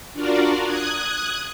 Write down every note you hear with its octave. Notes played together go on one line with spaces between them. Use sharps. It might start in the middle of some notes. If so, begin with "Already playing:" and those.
D4 F4 F#4 A#4 D5
D#6 F#6 G#6